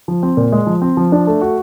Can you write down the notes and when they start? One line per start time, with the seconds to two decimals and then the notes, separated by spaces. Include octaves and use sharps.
0.08 F3
0.23 C4
0.37 A#2
0.52 G#3
0.67 F3
0.82 C4
0.97 F3
1.12 D4
1.27 A3
1.41 F#4